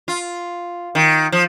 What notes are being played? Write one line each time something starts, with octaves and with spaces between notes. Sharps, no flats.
F4
D#3
F3